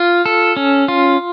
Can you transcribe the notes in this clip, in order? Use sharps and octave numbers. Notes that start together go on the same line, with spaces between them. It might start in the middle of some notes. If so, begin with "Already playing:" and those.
Already playing: F4
A4
C#4
F4